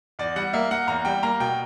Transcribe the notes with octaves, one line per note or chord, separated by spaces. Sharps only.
E2 D5
G3 F#5
A#3 E5
A#3 F#5
E2 A#5
G3 G5
A#3 A#5
B2 G5